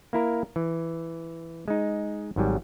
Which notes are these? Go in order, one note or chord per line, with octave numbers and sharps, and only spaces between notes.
A#3 E4 A#4
E3
G#3 D#4
G#1 G#2 F#3 G3